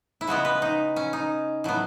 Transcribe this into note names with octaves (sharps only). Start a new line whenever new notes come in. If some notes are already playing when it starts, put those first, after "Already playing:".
E4
C#3 G#3 B3 F#4
B4
D#4
C#4
D#4
A2 F#3 B3